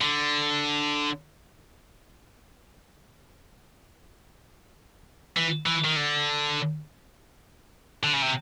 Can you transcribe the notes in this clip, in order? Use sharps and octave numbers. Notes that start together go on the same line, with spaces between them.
D3
E3
E3
D#3
D3
D3
C#3
C3